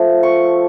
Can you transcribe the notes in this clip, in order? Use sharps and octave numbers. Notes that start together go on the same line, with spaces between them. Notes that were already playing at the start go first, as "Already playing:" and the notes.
Already playing: F3 A3
C#6